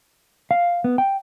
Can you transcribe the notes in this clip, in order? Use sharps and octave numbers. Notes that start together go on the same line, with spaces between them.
F5
B3
G5